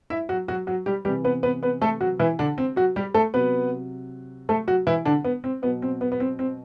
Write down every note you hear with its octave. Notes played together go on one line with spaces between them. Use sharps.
E4 E5
F#3 F#4
F#3 F#4
F#3 F#4
G3 G4
C3 E3 G3 G4
B3 B4
B3 B4
B3 B4
A3 A4
F#3 F#4
E3 E4
D3 D4
C4
F#3 F#4
G3 G4
A3 A4
C3 F#3 B3 B4
A3 A4
F#3 F#4
E3 E4
D3 D4
B3
C4
B2 F#3 B3
C4
B3
B3
C4
C4